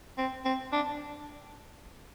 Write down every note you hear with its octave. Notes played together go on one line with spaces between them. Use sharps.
C4
C4
D4